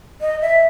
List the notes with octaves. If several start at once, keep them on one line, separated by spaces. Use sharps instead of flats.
D#5
E5